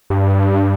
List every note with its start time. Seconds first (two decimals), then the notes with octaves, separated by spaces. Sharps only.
0.10 G2